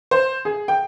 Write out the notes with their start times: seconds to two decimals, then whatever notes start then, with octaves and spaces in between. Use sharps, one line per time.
0.11 C5
0.45 G#4
0.68 G5